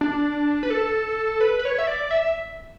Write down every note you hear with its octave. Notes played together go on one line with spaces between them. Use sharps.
D4
B4
A4
B4
B4
C#5
E5
D5
E5